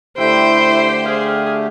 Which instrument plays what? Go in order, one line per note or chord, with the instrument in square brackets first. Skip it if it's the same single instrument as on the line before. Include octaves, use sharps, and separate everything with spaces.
[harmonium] D3 A3 G4 [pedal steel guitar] E4 [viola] C5 [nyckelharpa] G5
[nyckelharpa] G#4 [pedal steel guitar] F5